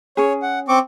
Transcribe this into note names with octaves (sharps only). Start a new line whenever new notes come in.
C#4 G#4 C#5
F#5
C4 C#6 D6